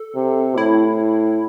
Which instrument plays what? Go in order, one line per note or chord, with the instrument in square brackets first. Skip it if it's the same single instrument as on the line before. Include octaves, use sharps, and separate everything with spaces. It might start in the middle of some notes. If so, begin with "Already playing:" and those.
Already playing: [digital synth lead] A4
[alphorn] C3
[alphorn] A2 [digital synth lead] E4